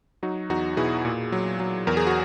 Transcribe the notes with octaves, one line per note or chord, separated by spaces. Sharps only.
F#3 D#4 F#4
E2 D#4 F#4
B2 E4 G#4
A#2
F#3
F#3
E2 A#4
G#4
F#4